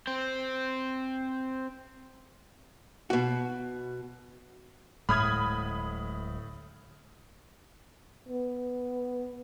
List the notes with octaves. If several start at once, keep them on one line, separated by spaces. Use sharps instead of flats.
C4 C5
B2 F#4
D1 A2 G#3 B5 D#6 F6 G#6
B3